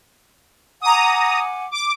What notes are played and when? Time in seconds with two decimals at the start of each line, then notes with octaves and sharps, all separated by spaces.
0.82 F#5 G#5 A#5 D6 D#6
1.71 D6